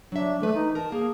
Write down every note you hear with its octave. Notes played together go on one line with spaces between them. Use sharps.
F#3 D4 E5
E3 A3 B4
D#4
A#4 A5
A#3 G#4